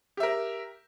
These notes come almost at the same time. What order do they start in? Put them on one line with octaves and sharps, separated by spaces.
G4 E5 A#4